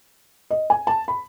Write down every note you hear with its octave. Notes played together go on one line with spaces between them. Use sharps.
D#5
G#5
A5
B5